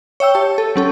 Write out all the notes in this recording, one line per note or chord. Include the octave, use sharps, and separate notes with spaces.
C#5 E5 G5 E6
G4 A5
A4
F#3 C#4 A4